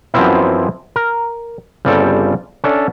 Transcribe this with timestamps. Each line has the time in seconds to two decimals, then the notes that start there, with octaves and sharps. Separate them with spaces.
0.14 F#2 E3 F3 B3 C4 E4
0.96 A#4
1.85 G1 C#3 G3 C4 A4 G5
2.64 C#4 D4 A4 E5